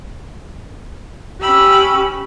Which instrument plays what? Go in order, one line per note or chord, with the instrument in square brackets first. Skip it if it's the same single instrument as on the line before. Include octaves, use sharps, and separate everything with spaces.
[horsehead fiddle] C#4 G4 [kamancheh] B5 E6